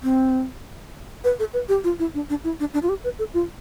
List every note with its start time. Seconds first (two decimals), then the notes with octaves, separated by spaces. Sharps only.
0.03 C4
1.24 B4
1.39 A4
1.54 B4
1.69 G4
1.84 F4
1.99 E4
2.14 D4
2.30 D4
2.44 E4
2.60 D4
2.74 D4
2.83 F4
2.89 G4
3.04 B4
3.19 A4
3.34 F4